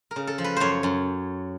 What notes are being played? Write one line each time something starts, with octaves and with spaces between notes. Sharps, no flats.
A#4
C#3
A4
F3
B4
F#2 C5 C#5
F#2